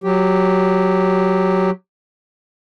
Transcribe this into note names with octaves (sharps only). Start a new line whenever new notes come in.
F#3 G4